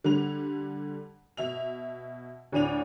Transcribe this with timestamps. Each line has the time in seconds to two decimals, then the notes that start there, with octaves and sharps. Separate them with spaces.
0.04 D3 G3 F7
1.37 B2 E5 F7
2.52 D2 A2 D4 D#7 F7